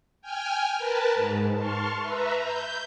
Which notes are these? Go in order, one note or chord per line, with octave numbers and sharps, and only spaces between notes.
G5 G#5 F6
A#4 B4 A5
G#2
A5 C6 C#6 F6
B4 E5 A#5
G6